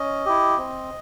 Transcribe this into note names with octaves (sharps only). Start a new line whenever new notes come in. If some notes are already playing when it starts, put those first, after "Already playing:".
Already playing: C#4 D#5
E4 G4
C4